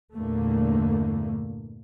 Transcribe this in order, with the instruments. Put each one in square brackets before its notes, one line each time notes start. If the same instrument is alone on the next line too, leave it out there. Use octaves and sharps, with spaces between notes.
[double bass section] E2 G2 A#2 D3 A3 A#3